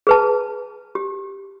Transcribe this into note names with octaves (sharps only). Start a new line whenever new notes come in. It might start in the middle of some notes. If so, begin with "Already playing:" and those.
G#4 B4 A5
G4